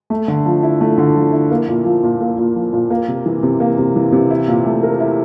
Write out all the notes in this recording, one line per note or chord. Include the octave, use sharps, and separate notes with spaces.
A3
D3
F3
E4
A3
D3
F3
E4
A#3
A#2
F3
A#2
A#3
A#2
F3
A#2
A#3
C3
E3
C3
A#3
C3
E3
C3
E4
A#2
A3
A#4
E4